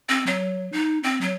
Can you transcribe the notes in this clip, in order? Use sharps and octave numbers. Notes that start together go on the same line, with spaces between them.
C4
F#3
D#4
C4
F#3